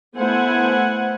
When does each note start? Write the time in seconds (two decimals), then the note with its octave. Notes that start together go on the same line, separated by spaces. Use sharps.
0.15 A3 B3 E4 C5 F#5 G#5